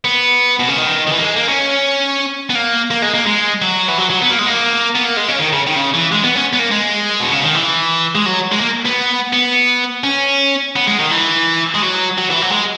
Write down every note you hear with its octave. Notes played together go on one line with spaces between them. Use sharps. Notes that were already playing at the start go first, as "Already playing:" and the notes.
B3
B2
C#3
D#3
D#3
E3
A#3
G#3
A#3
C#4
B3
A#3
A#3
G#3
A#3
G#3
F#3
E3
F#3
F#3
B3
A#3
G#3
A#3
B3
A#3
G#3
C#4
D#3
C#3
D#3
C#3
E3
G#3
B3
C#4
B3
A#3
G#3
B2
C#3
D#3
E3
G#3
F#3
G#3
A#3
B3
B3
C#4
B3
G#3
D#3
E3
G#3
F#3
F#3
E3
F#3
G#3